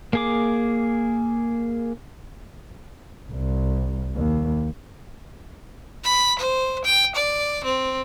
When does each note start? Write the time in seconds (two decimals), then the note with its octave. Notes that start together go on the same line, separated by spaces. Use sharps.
0.13 A#3 G#4 D6
3.31 C2
4.16 D#2
6.05 B5
6.39 C5
6.85 G5
7.16 D5
7.64 C4